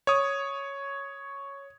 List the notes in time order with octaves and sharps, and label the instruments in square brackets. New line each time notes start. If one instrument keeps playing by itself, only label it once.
[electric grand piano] C#5 D#6